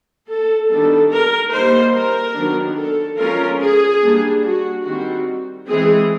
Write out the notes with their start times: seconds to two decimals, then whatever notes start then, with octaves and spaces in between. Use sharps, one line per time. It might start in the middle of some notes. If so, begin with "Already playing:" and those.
0.27 A4
0.69 D#3 G3 B3 D4 A4
1.11 A#4
1.52 G3 A#3 D#4 C5
1.93 A#4
2.35 D#3 F#3 B3 D4
2.77 A4
3.18 F3 G#3 C#4 F4 A#4
3.60 G#4
4.02 G3 A#3 D4
4.43 F#4
4.85 D#3 G3 C4 F#4
5.68 E3 G#3 C4 G#4